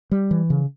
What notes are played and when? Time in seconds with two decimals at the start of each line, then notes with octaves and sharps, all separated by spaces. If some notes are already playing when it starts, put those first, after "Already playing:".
0.11 G3
0.31 E3
0.50 C#3